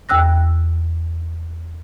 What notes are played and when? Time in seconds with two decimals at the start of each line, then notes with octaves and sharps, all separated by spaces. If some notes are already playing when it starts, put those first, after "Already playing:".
0.09 E2 G5 E6 F#6 A#6